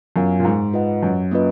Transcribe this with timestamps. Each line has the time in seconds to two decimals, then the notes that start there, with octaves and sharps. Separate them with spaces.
0.16 F#2 B3 F4 A#4 F5 G#5
0.40 A#2
0.45 G#2
0.73 F4 B4 D#5 F#5
1.03 F#2
1.31 A#3 C#4 F4 B4 D#5